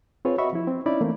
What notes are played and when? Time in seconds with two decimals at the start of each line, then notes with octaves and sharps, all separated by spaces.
0.25 C4 F4 G#4 B4 C#5
0.38 F#4 D#5 E5 B5 C#6
0.53 F3 E4
0.67 C4
0.86 C#4 D#4 E4 D5 B5
1.01 E3 A3 A#3 C4